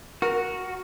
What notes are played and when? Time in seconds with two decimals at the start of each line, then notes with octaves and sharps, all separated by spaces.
0.22 F#4 A#4